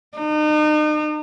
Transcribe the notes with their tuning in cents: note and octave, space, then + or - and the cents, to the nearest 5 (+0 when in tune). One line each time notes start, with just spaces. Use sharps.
D#4 -40